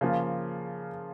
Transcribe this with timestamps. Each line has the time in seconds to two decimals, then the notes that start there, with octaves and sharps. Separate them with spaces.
0.01 C#3 F3 A#3 F4